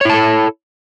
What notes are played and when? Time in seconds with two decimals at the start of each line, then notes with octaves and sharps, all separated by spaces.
0.01 C#5
0.05 E4
0.10 A5
0.14 A4